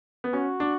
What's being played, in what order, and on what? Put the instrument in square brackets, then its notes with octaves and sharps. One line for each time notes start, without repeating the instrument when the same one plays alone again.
[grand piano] B3
[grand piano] C#4 [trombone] F#4
[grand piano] D4